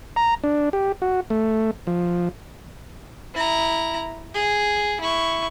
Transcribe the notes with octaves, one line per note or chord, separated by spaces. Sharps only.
A#5
D4
G4
F#4
A3
F3
E4 A#5
G#4
E4 C#6